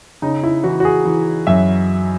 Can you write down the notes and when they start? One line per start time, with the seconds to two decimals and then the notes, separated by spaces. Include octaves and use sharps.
0.22 C#3 D#4
0.44 E4
0.64 E3 F#4
0.80 F#4
0.85 G#4
1.05 E3
1.47 F#2 E5